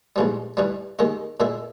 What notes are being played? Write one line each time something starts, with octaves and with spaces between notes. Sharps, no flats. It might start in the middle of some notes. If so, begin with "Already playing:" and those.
A#1 G#2 E3 G3
G2 E3 G3
D#2 D#3 G#3 D#4
A#2 G#3 B3 E4